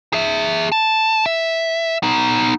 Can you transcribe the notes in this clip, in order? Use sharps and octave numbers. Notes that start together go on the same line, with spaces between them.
G#4 E5
A5
E5
B3 D#4